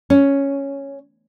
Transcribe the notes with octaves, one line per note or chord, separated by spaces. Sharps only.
C#4